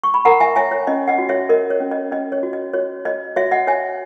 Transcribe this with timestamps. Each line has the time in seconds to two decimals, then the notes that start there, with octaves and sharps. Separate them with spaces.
0.04 C#6
0.14 B5
0.25 A#4 F#5 A#5
0.40 E5 G#5
0.56 C#5 E5 G#5
0.72 C#5
0.87 C#4 D#5
1.08 D#5 F#5
1.18 F#4
1.29 C#5 E5
1.49 A#4 D#5
1.70 C#5
1.80 C#4
1.91 D#5
2.11 C#4 D#5
2.32 C#5
2.43 F#4
2.53 D#5
2.73 F#4 C#5
3.05 C#5 D#5
3.36 F#4 C#5 E5
3.51 D#5 F#5
3.67 C#5 E5 G#5